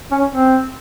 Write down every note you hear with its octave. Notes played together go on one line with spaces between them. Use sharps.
C#4
C4